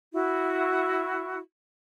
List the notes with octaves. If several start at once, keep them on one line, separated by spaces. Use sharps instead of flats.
E4 F#4